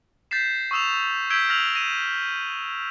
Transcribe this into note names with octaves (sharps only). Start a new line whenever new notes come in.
G6 A6 B6 C7 E7
C#6 D#6 E6 E7 F7
E6 G6 G#6 B6 D7 G7
E6 F6 A#6 F7 F#7
A#6 D#7 E7